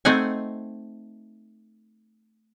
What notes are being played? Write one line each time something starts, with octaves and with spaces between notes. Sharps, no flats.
A3 C4 D#4 F#5 G#5